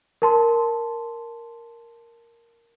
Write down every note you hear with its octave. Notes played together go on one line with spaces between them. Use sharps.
A#4 A5 C6